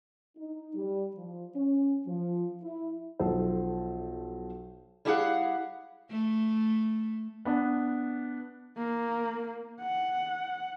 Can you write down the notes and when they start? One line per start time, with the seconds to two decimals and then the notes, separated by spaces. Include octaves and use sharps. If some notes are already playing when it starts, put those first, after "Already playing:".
0.37 D#4
0.75 G3
1.15 F3
1.55 C#4
2.06 F3
2.62 E4
3.19 B1 F3 A4 C5
5.05 G3 E4 G4 G#4 F5 F#5
6.10 A3
7.45 B3 D4
8.78 A#3
9.81 F#5